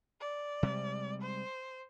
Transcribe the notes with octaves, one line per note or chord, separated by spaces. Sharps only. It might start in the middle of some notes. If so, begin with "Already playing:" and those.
D5
C3 G3 G#3
C5